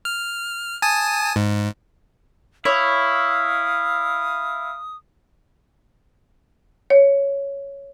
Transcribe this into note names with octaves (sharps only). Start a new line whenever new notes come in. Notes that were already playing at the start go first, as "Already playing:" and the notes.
F6
G#5 A5 D#6
G#2
E4 C#5 F5 D#6
C#5